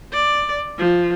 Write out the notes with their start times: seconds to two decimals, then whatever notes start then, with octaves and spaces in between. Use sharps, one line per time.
0.13 D5
0.78 F3